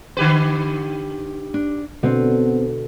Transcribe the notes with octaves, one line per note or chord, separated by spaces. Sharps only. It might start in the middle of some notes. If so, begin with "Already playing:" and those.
D3 G4 B4
D4
B2 D3 B3 C4